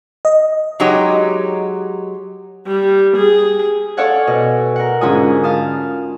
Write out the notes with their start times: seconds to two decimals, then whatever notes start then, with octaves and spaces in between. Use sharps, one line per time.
0.25 D#5
0.80 F#3 G#3 D#4 G4 C#5
2.66 G3
3.17 G#4
3.97 A4 C#5 D5 F5 F#5 G#5
4.27 B2 D#5
4.76 A#4 F#5
5.01 G#2 D3 C#4 F4 G#5 D#6
5.44 F5 A5 D#6